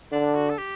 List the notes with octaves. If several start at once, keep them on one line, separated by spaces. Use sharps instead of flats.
D3 D4
F#4
A4
G4